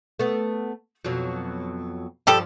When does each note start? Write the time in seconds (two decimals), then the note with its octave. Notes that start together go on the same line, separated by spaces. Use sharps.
0.19 A3 B3
1.05 F2 B2 F#3
2.27 G2 F3 G3 G4 A4